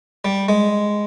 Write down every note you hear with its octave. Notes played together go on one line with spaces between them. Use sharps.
G3
G#3